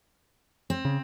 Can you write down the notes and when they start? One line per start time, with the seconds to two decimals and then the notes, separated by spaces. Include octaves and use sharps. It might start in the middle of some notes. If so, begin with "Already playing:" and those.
0.70 C4
0.85 C#3